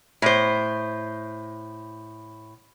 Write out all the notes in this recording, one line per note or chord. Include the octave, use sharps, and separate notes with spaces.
A2 C5